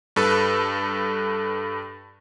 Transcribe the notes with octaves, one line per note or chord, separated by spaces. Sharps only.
G2 A4 B4